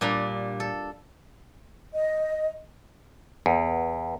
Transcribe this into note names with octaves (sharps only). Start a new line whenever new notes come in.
A#2 G3 D4 A#5
A4
D#5
E2